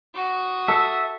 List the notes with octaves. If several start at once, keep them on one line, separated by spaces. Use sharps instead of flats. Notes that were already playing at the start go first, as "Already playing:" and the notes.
F#4 D#6
A4 E5